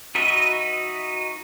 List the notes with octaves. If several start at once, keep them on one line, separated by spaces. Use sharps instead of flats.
D#4 F#4 B4 D#5 E5